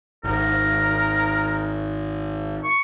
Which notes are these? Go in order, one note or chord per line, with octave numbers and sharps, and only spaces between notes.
G#1 A#4
C#6